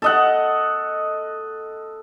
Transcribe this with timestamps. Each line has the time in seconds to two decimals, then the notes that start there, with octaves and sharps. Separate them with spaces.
0.02 A4 D#5 F#5